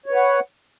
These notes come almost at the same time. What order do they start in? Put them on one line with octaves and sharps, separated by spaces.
C#5 B4 F#5